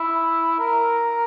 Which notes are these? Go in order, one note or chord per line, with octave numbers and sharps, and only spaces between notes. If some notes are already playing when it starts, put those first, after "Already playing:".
Already playing: E4
A#4